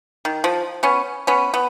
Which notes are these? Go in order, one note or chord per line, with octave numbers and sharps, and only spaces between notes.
D#3
F3
B3 C#4
B3 C#4
B3